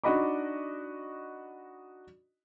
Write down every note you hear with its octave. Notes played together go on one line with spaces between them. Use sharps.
D4 D#4 F#4 D#5 B5 D6